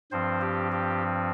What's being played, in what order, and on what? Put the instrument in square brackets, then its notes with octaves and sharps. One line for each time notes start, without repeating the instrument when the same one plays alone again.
[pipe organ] G2 F3 C4 C5
G4
G4